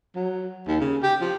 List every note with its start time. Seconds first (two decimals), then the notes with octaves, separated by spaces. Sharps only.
0.15 F#3
0.67 D#2
0.81 C#3
1.03 G4
1.21 F3